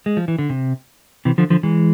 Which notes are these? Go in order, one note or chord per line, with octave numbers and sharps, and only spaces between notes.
G#3
F3
E3
D3
C3
C3 E3
D3 F3
D3 F3
E3 G#3